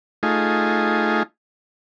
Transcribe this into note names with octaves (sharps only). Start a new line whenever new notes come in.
A3 D#4 F4 G#4